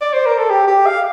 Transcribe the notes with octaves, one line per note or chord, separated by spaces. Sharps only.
D5
C5
A#4
A4
G4
G4
F5